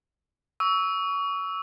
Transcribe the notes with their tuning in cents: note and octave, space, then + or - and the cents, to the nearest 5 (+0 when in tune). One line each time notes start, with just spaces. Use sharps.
C#6 +30 E6 -10